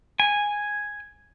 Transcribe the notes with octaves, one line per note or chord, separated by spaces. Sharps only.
G#5